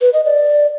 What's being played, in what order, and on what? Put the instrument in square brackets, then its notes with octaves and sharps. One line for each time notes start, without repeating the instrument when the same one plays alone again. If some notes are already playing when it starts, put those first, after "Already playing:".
[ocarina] B4
D#5
D5